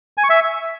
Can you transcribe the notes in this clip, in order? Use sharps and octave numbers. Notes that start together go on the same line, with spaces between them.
G#5
C#6
E5